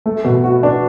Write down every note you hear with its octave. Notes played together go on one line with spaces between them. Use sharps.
A3
B2
F#4
D4